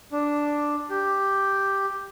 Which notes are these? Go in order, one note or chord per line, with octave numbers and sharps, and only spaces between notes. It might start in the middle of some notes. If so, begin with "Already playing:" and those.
D4
G4